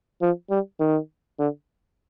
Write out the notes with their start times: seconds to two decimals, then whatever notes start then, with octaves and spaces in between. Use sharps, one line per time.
0.22 F3
0.50 G3
0.80 D#3
1.39 D3